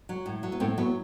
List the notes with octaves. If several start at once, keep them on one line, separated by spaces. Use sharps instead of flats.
F#3
A2
F#3
B3
A2 A3 C4
F#3 B3